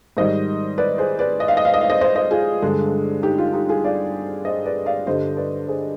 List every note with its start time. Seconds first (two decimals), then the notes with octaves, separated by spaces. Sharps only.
0.17 G#2 D#3 G3 C5 D#5
0.78 B4 D5
0.98 G#4 C5
1.19 B4 D5
1.40 D#5
1.48 F5
1.57 D#5
1.65 F5
1.74 D#5
1.81 F5
1.90 C5 D#5
2.01 C5 D#5
2.15 C5 D#5
2.31 F4 G#4
2.62 G2 D3 G#3
3.23 D#4 G4
3.38 F4
3.53 D#4 G4
3.68 F4 G#4
3.84 D5 F5
4.45 C5 D#5
4.66 B4 D5
4.86 D5 F5
5.07 G2 D3 G3 C5 D#5
5.37 B4 D5
5.68 G#4 C5